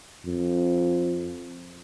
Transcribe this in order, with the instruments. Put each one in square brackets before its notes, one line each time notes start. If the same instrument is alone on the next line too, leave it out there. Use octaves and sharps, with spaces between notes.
[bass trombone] F2